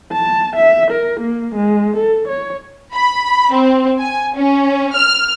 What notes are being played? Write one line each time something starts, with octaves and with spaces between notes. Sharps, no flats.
A5
E5
A#4
A#3
G#3
A4
C#5
B5
C4
G#5
C#4
F6